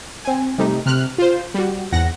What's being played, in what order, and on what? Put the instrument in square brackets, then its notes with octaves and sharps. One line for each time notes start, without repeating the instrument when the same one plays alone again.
[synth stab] C4 G#5
C3 G3 A3 D#4
C3 F6 F#6
F4 C5
G3 F#4
E2 G#2 F#5 A#6